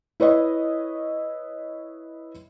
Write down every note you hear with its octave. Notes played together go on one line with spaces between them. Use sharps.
E4 B4 C#5 D#5